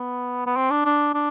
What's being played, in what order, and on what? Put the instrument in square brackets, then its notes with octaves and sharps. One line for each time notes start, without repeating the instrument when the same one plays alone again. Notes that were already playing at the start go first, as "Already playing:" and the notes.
Already playing: [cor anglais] B3
B3
C4
D4
D4
D4